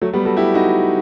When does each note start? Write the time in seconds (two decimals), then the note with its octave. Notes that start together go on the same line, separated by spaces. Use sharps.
0.02 F#3 A3
0.13 G3 B3
0.25 F#4 A4
0.36 E4 G4
0.54 D#4 F#4